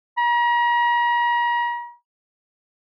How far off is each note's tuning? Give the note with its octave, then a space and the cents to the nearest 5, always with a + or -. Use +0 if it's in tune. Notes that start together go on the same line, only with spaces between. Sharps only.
A#5 +40